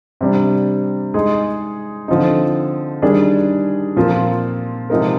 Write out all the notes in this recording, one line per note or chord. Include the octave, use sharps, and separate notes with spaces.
C3 G3 D4
G#3 D#4 G#4
D3 F3 C4 D#4
D#3 G3 D4 G#4
A#2 F3 C4 F4 A#4
C3 F3 G#3 D#4 A#4